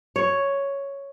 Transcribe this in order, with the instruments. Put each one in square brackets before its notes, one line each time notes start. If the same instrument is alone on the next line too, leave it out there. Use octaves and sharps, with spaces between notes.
[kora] C#5